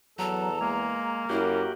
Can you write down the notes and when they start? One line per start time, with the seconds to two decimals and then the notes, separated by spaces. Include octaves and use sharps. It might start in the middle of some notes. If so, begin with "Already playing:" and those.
0.19 E2 F#3 A4 A#5
0.61 G#3 A#3
1.30 F#2 E4 F#4 G4